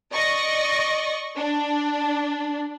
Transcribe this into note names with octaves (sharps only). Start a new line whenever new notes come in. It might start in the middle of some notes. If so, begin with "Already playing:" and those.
D5 D#5 C#6 A#6
D4